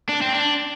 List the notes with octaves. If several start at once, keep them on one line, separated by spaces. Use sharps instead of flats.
D4
C4
D4